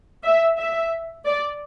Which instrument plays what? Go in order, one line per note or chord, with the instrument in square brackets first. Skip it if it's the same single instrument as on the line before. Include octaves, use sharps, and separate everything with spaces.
[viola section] E5
E5
D5